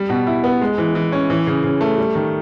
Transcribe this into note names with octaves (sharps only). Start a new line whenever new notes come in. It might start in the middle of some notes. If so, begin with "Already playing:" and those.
Already playing: G3
B2
E4
B3
G#3
E3
E3
C#4
E3
C#3
C#3
A3
G3
D#3